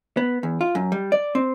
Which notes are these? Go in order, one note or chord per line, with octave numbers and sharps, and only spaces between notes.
B3
E2
F4
F#2
G3
D5
C4